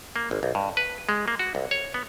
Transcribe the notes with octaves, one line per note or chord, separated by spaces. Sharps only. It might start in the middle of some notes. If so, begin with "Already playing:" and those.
A#3
G#1
B1
G2
B4
G#3
A#3
F#4
C2
C#5
B3